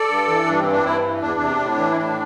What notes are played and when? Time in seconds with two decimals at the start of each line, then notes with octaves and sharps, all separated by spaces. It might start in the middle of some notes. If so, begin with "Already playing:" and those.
Already playing: A4 D5
0.09 G2
0.27 E3
0.46 G2 D4
0.59 C4
0.65 E3
0.71 D4
0.83 G2 C4 E4
1.02 E3
1.21 E2 D4
1.40 C3
1.59 A2
1.77 E3
1.91 E4
1.96 A2 D4